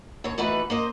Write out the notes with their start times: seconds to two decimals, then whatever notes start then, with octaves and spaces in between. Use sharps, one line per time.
0.24 D#2 C#5
0.38 E3 A3 D#4 F#4 B4
0.70 A#3 C5 D#5